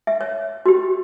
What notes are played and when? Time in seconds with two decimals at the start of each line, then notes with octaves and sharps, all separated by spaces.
0.07 E5
0.21 C#5
0.66 F#4 G4